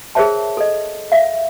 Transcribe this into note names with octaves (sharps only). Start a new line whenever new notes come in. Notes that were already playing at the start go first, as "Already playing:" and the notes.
G#4 A#4 C5 C#5 E5 A5
A4 D#5
E5 F5